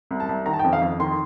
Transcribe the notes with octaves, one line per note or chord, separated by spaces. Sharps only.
C2
A5
C2
D#3 A#5
A5
G5
F2
F5
F2
D#3 C6